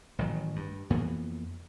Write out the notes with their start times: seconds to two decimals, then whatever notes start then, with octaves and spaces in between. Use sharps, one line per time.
0.19 A1 D#3 F#3
0.56 G2
0.90 F2 E3 A#3 B3